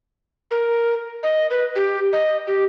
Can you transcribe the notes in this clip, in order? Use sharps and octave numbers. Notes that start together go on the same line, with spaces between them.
A#4
D#5
B4
G4
D#5
G4